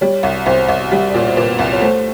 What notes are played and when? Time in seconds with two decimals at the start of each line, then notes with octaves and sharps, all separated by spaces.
0.01 G3 C#5
0.23 C2
0.46 C2 C5
0.68 C2
0.92 G3
1.09 D5
1.15 A#2 C#5
1.28 C5
1.36 A#2 B4
1.59 C2
1.73 C#5
1.81 A3 C5